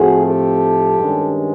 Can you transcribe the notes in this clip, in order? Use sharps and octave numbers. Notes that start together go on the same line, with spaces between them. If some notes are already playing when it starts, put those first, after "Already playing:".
Already playing: A2 F3 A3 C4 F#4 G#4
G4 A4
G2 D#3 G#3 C#4